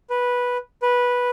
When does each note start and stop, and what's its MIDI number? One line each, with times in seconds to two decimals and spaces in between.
0.10 0.57 71
0.82 1.30 71